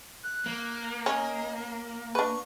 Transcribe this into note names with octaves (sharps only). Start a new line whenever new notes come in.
F#6
A#3
C#4 D#5
A#4
D4 B4 C#6